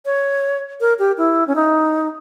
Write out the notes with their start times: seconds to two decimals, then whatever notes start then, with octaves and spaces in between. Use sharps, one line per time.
0.06 C#5
0.81 A#4
0.99 G4
1.18 E4
1.48 C#4
1.56 D#4